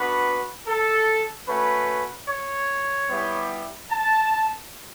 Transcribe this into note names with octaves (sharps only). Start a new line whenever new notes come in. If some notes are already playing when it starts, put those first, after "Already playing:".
Already playing: B3 D4 F#4 B4
A4
A3 C#4 F#4 B4
C#5
G3 B3 E4 G4
A5